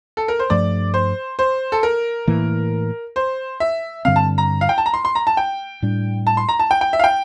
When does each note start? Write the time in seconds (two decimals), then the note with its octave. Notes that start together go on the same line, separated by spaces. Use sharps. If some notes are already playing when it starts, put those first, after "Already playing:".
0.17 A4
0.28 A#4
0.39 C5
0.50 G2 F3 A3 D5
0.94 C5
1.39 C5
1.72 A4
1.83 A#4
2.27 A2 E3 A#3
3.16 C5
3.60 E5
4.05 G2 D3 G3 C4 F5
4.16 A5
4.38 A#5
4.61 F5
4.69 G5
4.78 A5
4.86 A#5
4.94 C6
5.05 C6
5.15 A#5
5.27 A5
5.37 G5
5.82 A2 G3 D4
6.27 A5
6.37 C6
6.49 A#5
6.59 A5
6.71 G5
6.81 G5
6.93 E5
6.99 F5
7.04 G5